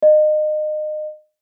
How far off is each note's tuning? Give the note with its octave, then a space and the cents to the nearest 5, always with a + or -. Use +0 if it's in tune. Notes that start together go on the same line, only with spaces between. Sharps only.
D#5 -30